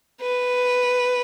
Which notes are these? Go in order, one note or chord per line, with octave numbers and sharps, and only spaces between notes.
B4